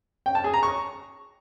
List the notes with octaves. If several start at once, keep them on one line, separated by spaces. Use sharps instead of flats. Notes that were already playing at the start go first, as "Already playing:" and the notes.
G5
A5
G#4
A#5
C#6